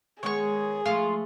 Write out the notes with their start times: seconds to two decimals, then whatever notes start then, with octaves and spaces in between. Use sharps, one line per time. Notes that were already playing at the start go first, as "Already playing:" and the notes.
0.23 D#3 G#3 B3 G#4 C#5 C#6
0.86 F3 G#3 A3 F4